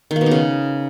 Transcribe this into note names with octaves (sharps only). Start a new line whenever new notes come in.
D#3
A#3
B2
D#4
C#3